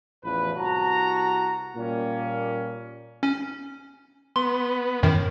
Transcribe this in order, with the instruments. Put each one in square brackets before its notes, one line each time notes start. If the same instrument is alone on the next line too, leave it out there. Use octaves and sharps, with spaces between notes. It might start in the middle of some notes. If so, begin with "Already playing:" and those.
[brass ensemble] A1 E2 F3 B4
C2 F#4 A5 A#5
A#2 G3 A#3 C#4
[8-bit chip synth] C#4
[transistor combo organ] B3 [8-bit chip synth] C6
[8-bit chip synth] F#2 A2 D#3